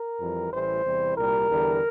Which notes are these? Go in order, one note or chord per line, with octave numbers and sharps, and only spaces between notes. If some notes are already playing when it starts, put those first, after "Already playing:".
Already playing: A#4
F2 E3 G3
A1 A2 E3 G3 C5
E2 C3 E3 G3
C2 A#2 G3 A#4
E2 D3 G3